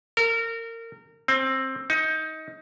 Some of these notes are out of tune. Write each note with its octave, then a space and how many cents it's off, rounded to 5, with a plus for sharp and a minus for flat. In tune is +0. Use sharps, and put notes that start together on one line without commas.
A#4 -25
C4 +15
D#4 +20